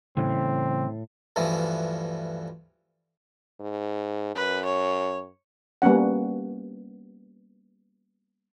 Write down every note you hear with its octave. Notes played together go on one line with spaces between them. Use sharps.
A2 C#3 E3 G3 C4
D2 G2 E3 F3
G#2
F#2 B4
C#5
G3 A#3 B3 C#4 F#5